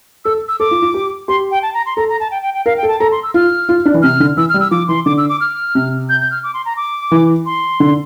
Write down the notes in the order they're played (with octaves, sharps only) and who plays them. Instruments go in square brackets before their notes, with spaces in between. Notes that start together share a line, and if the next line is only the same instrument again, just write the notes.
[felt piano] A4 [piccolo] E6
[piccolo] E6
[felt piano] A4 [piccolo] D6
[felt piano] F4
F4
G4
[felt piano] G4 [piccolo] C6
[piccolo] G5
A5
A#5
C6
[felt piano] A4 [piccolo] A#5
[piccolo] A#5
A5
G5
G5
G5
[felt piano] A#4 [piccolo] F5
[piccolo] G5
[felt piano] A4
[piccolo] A5
[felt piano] A4 [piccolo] A#5
[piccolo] C6
E6
[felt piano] F4 [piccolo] F6
[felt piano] F4
D4
E3
[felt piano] C3 [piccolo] F6
[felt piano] D3
[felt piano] E3 [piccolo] E6
[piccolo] F6
[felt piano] G3
[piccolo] E6
[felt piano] F3 [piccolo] D6
[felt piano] E3 [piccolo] C6
[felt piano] D3 [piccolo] D6
[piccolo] E6
D6
F6
[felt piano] C3
[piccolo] G6
G6
F6
D6
C6
A#5
D6
[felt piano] E3
[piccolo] C6
[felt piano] D3